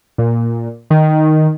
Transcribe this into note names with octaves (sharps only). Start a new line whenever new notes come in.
A#2
D#3